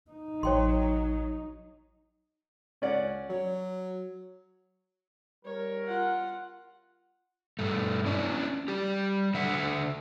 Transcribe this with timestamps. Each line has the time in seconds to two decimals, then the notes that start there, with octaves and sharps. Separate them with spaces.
0.11 D#4
0.43 A1 F#3 C#5 G5 C6
2.82 C#2 C#4 D5 F#5
3.30 F#3 C#5
5.45 G3 A#4 C#5
5.86 F4 F#5
7.59 G2 A3
8.06 C#4 D4 E4 D5
8.68 G3 G4
9.34 D3 E5 F#5